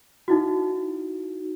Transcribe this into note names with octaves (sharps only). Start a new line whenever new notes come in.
D#4 E4 F#4